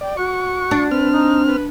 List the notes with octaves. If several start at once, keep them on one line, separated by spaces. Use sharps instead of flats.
D5 G5
F#4 C#6
D4
C4 B4 F6
D#4
B4